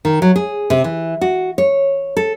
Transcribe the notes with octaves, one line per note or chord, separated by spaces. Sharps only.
D#3
F#3
G#4
C3
E3
F#4
C#5
A4